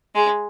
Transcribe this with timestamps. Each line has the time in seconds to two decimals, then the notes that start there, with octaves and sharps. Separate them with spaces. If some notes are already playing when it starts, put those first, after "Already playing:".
0.15 G#3